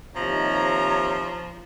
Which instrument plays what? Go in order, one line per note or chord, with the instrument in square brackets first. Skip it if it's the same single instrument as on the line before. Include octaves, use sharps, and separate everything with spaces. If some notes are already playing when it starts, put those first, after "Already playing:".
[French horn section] D#2 C3 D#4 [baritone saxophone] F3 [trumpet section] C#5 [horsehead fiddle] A#5